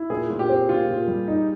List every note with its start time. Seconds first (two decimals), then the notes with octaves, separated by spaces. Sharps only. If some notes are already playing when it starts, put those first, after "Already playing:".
Already playing: E4
0.10 A#2 G#4
0.30 A#2
0.39 G4
0.49 C4
0.68 A#2 F4
0.89 A#2
1.08 G3
1.28 D#4